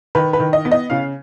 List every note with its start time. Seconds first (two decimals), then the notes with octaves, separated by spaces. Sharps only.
0.15 D#3 B4
0.33 B4
0.40 D#3
0.53 D#5
0.65 B3
0.72 D#5
0.90 C#3 F5